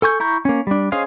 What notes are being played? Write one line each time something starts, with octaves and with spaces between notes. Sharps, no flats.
A4 G#5 C#6 G6
E4 A#5 C#6 G6
A#3 C#4
G3 D4
C#4 G#4 C5 D#5 F5